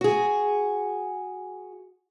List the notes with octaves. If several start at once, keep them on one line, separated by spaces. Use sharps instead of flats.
F#4 G#4